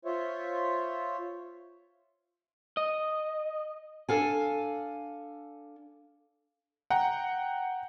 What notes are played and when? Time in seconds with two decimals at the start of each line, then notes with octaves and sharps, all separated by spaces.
0.05 F4 C5 C#5 E5
2.77 D#5
4.09 D4 A4 F5 G#5
6.90 F#5 G5 A#5